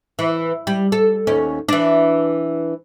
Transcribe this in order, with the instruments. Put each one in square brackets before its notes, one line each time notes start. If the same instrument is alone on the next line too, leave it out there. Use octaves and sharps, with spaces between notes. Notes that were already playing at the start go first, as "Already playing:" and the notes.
[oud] E3
G3
A4
D#2 C#4
E3 D4